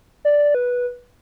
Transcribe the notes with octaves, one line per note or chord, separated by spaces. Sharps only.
D5
B4